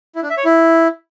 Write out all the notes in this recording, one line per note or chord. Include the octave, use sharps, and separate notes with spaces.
E4
D4
E5
C#5
E4